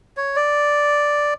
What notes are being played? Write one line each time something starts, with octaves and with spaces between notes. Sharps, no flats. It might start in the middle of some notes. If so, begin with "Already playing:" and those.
C#5
D5